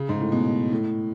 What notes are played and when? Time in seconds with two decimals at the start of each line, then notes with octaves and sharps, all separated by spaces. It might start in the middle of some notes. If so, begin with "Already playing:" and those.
Already playing: C#3
0.09 G#2
0.20 A2
0.32 B2
0.72 A2